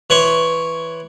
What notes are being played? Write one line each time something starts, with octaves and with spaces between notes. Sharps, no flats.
E3 C#5 C6